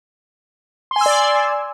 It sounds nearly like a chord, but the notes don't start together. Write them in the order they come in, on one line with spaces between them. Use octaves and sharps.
C6 G#5 E6 D5